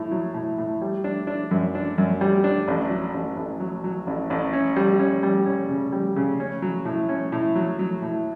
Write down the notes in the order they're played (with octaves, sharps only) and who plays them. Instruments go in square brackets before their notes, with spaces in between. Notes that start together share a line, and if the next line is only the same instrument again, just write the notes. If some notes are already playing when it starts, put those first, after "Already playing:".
Already playing: [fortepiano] A2
F#3
A2
A2
G3
D4
D4
F#2
D4
F#2
G3
D4
A1
F#3
A1
A1
F#3
F#3
A1
A1
C#4
G3
C#4
G3
C#4
C#3
G3
C#3
C#4
F#3
A2
C#4
A2
F#3
F#3
A2